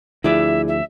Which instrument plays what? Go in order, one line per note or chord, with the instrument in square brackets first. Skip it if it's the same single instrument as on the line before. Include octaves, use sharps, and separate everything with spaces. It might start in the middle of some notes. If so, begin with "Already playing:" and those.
[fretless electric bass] D2 F3 [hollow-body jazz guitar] E4 G#4 D5 [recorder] E5
[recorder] E5